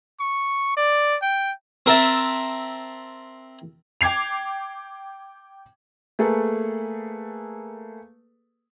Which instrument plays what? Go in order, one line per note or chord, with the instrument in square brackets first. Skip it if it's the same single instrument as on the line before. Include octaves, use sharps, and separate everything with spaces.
[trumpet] C#6
D5
G5
[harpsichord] C4 A#4 E5 A5
[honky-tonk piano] G5 D6 G#6 C7 F7
[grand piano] A3 A#3 G#4 A4 B4